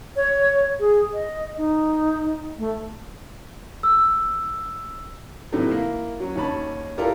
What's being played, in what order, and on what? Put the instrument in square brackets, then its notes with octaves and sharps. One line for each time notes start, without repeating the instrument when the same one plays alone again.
[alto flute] C#5
G#4
D#5
D#4
A3
[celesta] E6
[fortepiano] A2 C3 D#3 E3 F#3 A3
A#3 E4
F#3 C#4
D#2 D#3 C#4 A5 B5
E4 F4 G4 A4 A#4 D5